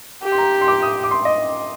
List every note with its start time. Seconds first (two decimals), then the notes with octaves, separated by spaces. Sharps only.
0.23 G4
0.32 C6
0.38 A#5
0.61 C6
0.68 D6
0.82 D#6
1.04 D6
1.11 C6
1.25 D#5